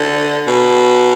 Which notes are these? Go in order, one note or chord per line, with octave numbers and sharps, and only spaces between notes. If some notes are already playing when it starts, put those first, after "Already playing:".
Already playing: D3
B2